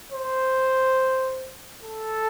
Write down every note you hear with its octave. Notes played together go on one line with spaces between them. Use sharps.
C5
A4